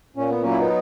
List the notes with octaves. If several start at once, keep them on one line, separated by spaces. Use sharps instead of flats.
A#2 C#4
B3
F#3 A#3 C#4
E4
B3 D#4